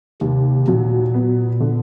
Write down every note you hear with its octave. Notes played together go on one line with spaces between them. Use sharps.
D#2 C3
A#2 F#3
B3
D3